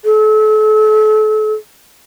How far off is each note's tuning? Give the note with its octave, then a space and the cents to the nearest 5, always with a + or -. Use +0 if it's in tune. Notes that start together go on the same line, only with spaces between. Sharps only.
A4 -35